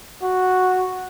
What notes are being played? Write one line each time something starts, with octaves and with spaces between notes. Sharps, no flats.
F#4